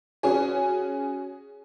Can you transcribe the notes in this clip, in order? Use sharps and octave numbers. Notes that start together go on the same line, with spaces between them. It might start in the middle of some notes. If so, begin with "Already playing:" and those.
C#4 F#4 G#4